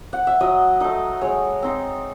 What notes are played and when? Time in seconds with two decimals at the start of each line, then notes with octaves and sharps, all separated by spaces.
0.13 F#5
0.27 E5
0.40 F#3 D#5
0.80 A3 D#4 D#5
1.21 G#3 C#5
1.62 C4 D#4